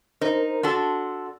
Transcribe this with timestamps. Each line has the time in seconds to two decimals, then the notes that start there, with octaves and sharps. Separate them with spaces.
0.21 D#4 A#4 C5
0.63 D4 F#4 A4 C6